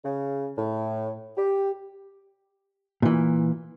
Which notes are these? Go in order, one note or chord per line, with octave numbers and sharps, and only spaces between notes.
C#3
A2
G4
A#2 E3